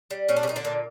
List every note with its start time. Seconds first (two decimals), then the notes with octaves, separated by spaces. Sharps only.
0.11 G3
0.29 A#2 C#4
0.36 D4
0.43 C#3 C#4
0.47 A#2 D#4
0.56 D3 D4
0.65 A#2